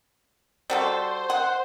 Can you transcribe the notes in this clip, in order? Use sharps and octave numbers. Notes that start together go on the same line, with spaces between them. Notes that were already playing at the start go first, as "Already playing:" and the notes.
G3 F#4 A4 C5
F#5